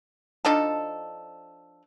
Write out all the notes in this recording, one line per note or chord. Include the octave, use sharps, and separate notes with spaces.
F3 D4 D#4 A4